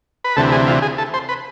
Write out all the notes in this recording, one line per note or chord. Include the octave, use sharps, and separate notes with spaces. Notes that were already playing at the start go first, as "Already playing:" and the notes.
B4
D2 C3 E3 A4
G#4
F4
G#4
A4
C5
B4